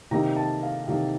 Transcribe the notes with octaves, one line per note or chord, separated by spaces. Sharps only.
C3 D#3 A#3 D#4 A#5
A5
F5
C3 D#3 A#3 D#4 F5